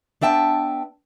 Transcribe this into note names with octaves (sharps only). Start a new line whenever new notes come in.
B3 D4 E5 G5 A5